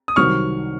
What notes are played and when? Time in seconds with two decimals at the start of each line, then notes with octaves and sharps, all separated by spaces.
0.08 D#6
0.16 C2 C3 D#3 F#3 C#6 F6